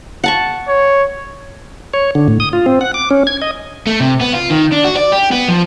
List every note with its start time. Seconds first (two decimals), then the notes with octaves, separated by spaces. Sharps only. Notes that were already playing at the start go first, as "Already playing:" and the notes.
0.24 F#5 A5 C#6
0.68 C#5
1.94 C#5
2.15 D3
2.28 A2
2.40 D#6
2.53 F4
2.66 C4
2.81 F#5
2.94 D6
3.11 C#4
3.27 G#6
3.42 D#5
3.87 A3
4.00 C3
4.20 B3
4.33 F4
4.50 D#3
4.72 D4
4.84 F#4
4.96 D5
5.12 G4
5.31 B3
5.48 F3